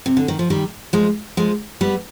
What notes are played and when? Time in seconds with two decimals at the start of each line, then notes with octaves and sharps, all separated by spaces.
0.06 C3
0.17 D3
0.28 D#3
0.39 F3
0.50 D#3 G3
0.93 F3 G#3
1.37 F3 G#3
1.81 G3 B3